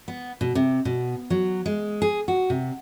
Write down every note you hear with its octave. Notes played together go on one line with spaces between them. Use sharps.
B3
B2
C3
B2
F#3
G#3
G#4
F#4
C3